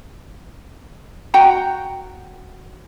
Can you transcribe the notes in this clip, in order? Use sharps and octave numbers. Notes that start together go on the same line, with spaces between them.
F#4 F#5 G5 A#5